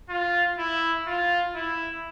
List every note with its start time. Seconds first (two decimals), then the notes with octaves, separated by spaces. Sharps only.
0.09 F4
0.58 E4
1.07 F4
1.56 E4